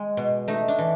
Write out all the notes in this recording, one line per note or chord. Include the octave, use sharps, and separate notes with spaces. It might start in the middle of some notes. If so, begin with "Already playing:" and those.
Already playing: G#3
B2
A3 D#4
D4
E3